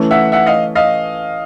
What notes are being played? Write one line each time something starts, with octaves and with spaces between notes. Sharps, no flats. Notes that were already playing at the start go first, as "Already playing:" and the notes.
Already playing: E3 A3 C#4
E5 F#5
E5 F#5
D#5 F5
D#5 F5